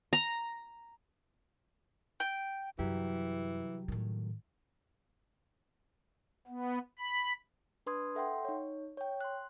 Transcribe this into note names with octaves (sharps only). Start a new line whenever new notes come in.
A#5
G5
C2 F#2 E3 F#3 G4
A2 D#3
B3
B5
D4 B4 C6 D#6 G#6
A4 E5 F#5 G5 C6
D#4 C#5
C#5 G5
C6 F#6